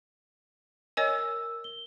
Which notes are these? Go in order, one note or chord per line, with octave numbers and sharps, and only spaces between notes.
A#4 C#5 D#5 G#5 E6
G7